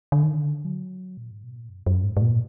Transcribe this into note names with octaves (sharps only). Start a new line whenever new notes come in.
D3
D#3
D3
F#3
A#2
G#2
B2
A#2
F#2
F#2
G#2
G#2
A#2